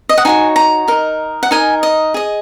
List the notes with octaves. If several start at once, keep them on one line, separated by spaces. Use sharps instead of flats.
D#5
F#5
D#4 F#4 C#5 G#5
A#5
D#4 A#4 D#5
F#5
D#4 A#4 D#5 G#5
D#5
G#4 D#5